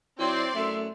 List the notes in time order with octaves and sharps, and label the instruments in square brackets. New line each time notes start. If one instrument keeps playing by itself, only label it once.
[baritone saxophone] F#3 [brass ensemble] C4 [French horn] E4 [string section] D5 C6
[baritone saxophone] F#2 [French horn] A3 [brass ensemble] E5